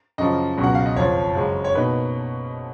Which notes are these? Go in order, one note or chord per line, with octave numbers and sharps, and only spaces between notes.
F#2 C#3 F3 D#5
C#2 B2 F#3 C#4
F#5
F5
D#5
F#1 F2 F3 C#5
F#2 C#3 G#3
C#5
B2 A#3 D#4 B4